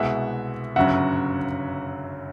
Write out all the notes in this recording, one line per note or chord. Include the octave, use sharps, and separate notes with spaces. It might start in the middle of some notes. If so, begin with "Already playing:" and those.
Already playing: C2 B2 G#3 E5 F#5
G1 F#2 C#3 F#3 E5 F#5